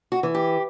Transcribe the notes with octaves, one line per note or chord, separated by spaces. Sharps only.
F#4
E3
G4